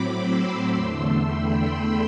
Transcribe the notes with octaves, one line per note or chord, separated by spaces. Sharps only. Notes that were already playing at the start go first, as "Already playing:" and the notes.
Already playing: A2 F#3 C4 B5 D6
C6 E6
E2 D3 A3
G5 B5